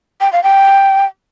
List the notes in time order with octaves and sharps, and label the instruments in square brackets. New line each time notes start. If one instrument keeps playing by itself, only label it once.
[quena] G5
F5
G5